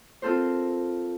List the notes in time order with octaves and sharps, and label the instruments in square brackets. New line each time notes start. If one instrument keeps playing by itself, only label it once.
[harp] C4 F4 A4 A#4 C5